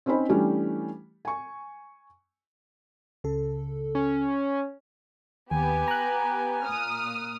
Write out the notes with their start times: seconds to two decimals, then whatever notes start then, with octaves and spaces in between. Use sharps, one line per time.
0.06 C4 C#4 D#4 C5 B5
0.29 E3 G3 A3 C#4 D4 G4
1.25 G#5 C#6
3.24 C#2 C#3 A4
3.95 C#4
5.51 D#2 B3 G4 G#5
5.88 A#5 F#6
6.64 A#2 D#6 F6